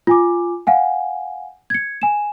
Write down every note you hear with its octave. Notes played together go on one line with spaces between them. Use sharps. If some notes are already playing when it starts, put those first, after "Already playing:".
F4 G#5 D6
F5 F#5 G#5
G#6 C#7
G#5 E7